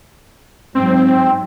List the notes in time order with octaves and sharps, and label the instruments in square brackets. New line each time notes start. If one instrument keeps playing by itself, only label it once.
[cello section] G#2 F#3 [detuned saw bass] C4